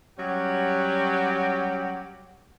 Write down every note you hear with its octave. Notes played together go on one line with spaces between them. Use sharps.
F#3 G3 C#4 F#4 G4